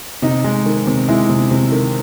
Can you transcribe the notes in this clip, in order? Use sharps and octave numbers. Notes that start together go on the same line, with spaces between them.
C3 D#4
G#3
D#3
C3
G#3 E4
C3
C3
D#3